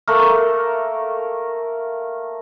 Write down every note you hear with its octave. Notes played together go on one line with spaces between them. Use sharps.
A3 A#3 A#4